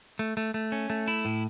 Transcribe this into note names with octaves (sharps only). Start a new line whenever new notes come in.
A3
A3
A3
C#4
A3
E4
A2